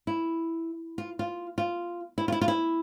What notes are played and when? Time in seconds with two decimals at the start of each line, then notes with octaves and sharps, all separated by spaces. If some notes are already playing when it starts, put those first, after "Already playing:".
0.07 E4
0.98 F4
1.19 F4
1.58 F4
2.18 E4
2.28 F4
2.32 E4
2.41 F4
2.48 E4